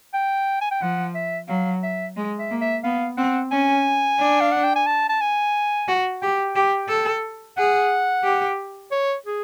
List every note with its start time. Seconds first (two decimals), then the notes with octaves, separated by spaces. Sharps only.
0.14 G5
0.61 G#5
0.71 G5
0.81 F3 F#5
1.15 E5
1.48 F#3 F5
1.83 E5
2.16 G#3
2.39 E5
2.50 A#3
2.61 E5
2.84 B3 F5
3.17 C4 F#5
3.51 C#4 G#5
4.19 D4
4.41 F5
4.52 F#5
4.64 G5
4.76 G#5
4.87 A5
5.09 A5
5.21 G#5
5.88 F#4
6.22 G4 G5
6.56 G4
6.89 A4
7.57 G#4 F#5
8.24 G4
8.91 C#5
9.26 G#4